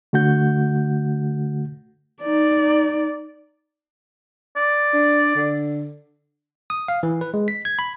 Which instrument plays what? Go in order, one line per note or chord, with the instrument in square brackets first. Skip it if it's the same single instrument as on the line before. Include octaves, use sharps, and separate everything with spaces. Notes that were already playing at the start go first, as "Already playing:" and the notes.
[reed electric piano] D3 A3 F#4 F#5 G6
[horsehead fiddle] D#4 D5
[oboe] D5
[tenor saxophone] D4
D3
[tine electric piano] D#6
F5
E3
B4
G#3
B6
G#6
B5